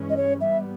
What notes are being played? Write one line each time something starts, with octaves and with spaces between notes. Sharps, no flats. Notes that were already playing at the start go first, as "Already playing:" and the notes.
Already playing: G2 E3 G#3 C#4
D#5
C#5
G#2 G3 B3 E5